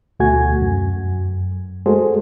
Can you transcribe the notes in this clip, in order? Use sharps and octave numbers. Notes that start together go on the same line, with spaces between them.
D2 B2 A3 F#4 G#5 G#6
F#2
G#3 A3 F#4 G#4 A4 C5